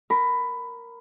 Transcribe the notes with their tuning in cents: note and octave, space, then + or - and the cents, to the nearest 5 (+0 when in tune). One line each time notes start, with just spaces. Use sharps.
A#4 +0 B5 +15